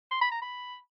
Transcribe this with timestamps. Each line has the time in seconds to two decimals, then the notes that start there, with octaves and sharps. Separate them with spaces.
0.11 C6
0.21 B5
0.32 A#5
0.42 B5